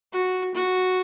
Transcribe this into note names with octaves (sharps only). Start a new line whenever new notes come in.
F#4
F#4